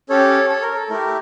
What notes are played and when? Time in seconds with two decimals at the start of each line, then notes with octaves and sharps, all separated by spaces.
0.09 C#4 G4 A4 C#5
0.49 A4 C#5
0.62 A#4
0.76 A4
0.90 A3 E4 G4 A#4